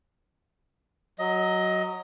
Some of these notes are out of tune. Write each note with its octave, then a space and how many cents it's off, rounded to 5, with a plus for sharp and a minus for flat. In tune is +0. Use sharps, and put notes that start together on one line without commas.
F#3 +0 D#5 +15